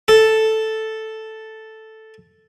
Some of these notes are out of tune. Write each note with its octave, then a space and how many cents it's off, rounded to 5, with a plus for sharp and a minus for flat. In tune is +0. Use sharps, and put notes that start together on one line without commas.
A4 +0